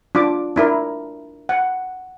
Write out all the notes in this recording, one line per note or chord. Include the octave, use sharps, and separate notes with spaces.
D4 F4 D6
D4 E4 A#4
F#5